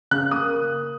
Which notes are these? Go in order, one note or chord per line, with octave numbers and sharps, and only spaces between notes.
C#3 F#6
A#3 D#6